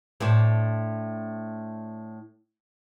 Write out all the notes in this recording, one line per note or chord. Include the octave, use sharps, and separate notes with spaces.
A2 C4 D4